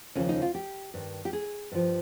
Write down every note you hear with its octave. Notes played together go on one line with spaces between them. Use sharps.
D#2 C#3 F3 C#4
D#4
F4
G4
G2 D#3
G4
G#4
G2 F3